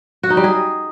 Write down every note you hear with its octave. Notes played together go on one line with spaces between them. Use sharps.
F#4
D#4
G3
G#4